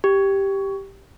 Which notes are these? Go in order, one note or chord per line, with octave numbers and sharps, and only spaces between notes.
G4